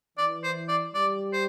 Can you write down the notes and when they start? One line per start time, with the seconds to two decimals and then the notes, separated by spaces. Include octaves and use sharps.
0.18 E3 D5
0.43 C5
0.69 D5
0.94 G3 D5
1.33 C5